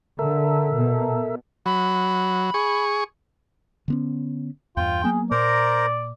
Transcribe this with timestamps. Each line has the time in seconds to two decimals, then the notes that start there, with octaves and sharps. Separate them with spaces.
0.19 D3 A4 A#4 E5
0.73 B2
1.66 F#3 B5
2.54 G#4 C#6
3.88 D3 B3 C#4
4.77 E2 G2 F4 G5
5.04 F#3 A#3 B3 G#4
5.31 A#2 A#4 C5 D5 A#5